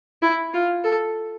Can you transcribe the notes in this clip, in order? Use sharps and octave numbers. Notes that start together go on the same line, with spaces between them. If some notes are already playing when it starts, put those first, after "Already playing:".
E4
F4
A4